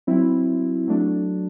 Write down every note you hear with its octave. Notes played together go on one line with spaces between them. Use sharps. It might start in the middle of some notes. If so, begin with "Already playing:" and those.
F#3 C4 E4
F#3 A3 D4